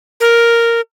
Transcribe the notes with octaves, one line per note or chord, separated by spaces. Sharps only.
A#4